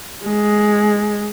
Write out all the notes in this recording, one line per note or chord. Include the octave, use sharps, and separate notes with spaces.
G#3